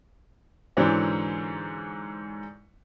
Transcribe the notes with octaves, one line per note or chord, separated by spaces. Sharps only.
G#2 D3 E3 F#3 C4 E4